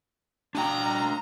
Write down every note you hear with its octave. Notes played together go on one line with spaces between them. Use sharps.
D4 F#4 G5 A#5